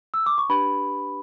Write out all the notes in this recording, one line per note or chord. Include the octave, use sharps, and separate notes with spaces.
E6
D6
C#6
D4 G4 B4 B5